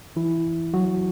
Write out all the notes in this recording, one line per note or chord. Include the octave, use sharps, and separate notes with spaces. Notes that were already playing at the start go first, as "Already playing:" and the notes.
E3 E4
F#3 F#4